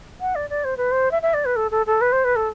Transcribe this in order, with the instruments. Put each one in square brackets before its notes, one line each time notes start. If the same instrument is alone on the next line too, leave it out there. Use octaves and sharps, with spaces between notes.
[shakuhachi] F#5
D5
D5
C5
B4
C5
E5
E5
D5
B4
A4
A4
A4
B4
C5
B4
A4